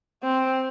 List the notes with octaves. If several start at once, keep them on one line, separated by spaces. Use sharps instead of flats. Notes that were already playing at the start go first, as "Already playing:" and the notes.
C4